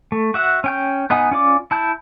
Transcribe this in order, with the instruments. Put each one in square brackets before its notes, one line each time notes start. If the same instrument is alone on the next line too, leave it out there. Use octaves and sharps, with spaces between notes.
[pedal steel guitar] A3
F#4 E5 F#5
C#4 G5 G6
B3 D#4 D#5 F#5 G#5
C#4 F4 D5 D6
E4 A5 G6